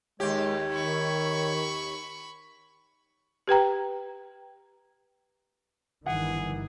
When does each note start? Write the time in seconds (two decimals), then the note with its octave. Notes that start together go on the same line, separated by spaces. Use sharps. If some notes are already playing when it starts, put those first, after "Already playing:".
0.20 D#2 G#3 G4 C#5
0.74 D#3 B5 C#6
3.47 G4 B4 G5 A#5
6.06 G1 D#3 E3 G#4 F#5